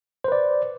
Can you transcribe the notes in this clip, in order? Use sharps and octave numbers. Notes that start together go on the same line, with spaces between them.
B4 C5 D5